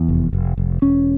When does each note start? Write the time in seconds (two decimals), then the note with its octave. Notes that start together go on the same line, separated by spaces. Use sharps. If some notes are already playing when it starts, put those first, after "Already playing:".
Already playing: E2
0.09 F1
0.33 F1
0.58 F1
0.82 E1 C#4